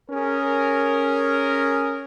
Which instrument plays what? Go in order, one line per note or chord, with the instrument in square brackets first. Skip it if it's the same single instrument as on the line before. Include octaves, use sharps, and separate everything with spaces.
[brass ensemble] C#4 G#4 A#4